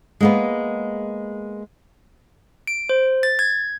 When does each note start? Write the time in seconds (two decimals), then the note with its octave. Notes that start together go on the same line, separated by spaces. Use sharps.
0.21 G#3 A#3 B3
2.67 D7
2.89 C5
3.23 A6
3.39 G#6